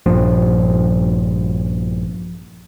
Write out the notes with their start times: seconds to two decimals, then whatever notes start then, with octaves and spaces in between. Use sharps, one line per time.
0.06 A#1 G2 F3